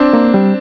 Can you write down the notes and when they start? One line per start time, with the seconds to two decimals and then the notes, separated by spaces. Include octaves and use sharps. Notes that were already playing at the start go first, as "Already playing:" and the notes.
Already playing: C4 D4
0.13 A#3
0.34 G3